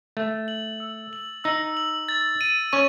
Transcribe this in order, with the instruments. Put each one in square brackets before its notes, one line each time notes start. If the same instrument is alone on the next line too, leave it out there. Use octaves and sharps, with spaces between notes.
[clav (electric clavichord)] A3 [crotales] A6
[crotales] F#7
E6
F#7
[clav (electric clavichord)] D#4 [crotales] E6
[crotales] F#7
A6
D#7
[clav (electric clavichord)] C#4 [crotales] C#6